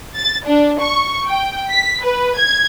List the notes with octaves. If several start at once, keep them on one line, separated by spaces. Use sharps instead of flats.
A6
D4
C#6
G5
B6
B4
G#6